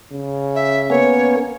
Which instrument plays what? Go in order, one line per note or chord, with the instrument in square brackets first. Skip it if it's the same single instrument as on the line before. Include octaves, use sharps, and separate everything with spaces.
[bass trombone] C#3
[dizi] E5
[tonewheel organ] A#3 B3 C#4 [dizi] C#5